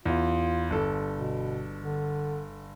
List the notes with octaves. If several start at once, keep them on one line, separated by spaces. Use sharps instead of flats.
E2 F4
G1 A4
B2
D3